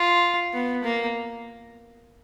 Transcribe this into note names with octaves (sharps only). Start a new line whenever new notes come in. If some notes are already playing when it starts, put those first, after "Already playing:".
Already playing: F4
B3
A#3